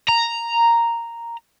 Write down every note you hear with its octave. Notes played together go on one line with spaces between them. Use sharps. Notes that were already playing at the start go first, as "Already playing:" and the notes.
A#5